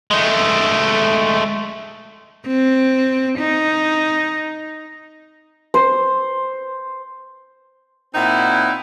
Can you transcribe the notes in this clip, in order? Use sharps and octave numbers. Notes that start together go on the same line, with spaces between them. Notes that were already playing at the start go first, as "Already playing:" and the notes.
G#3 A3
C4
D#4
C5
A#2 C4 D#4 E4 F#5